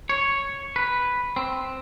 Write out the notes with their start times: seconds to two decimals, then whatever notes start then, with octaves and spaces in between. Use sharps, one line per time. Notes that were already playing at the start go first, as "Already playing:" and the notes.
0.10 C#5
0.76 B4
1.36 C4